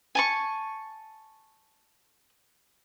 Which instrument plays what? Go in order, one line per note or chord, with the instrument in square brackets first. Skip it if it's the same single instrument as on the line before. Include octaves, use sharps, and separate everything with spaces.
[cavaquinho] G#5 A5 C#6